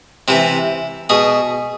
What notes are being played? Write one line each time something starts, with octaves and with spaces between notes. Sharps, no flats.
C3 E3 E4
B2 G#4